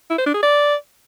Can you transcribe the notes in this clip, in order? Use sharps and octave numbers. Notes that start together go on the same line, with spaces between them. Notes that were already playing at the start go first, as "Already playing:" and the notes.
E4
C5
D4
G#4
D5